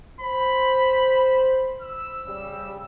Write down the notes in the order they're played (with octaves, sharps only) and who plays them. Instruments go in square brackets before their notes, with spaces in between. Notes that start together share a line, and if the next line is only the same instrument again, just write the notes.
[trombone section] C5 [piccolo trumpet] B5
[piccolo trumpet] E6
[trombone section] C#3 G3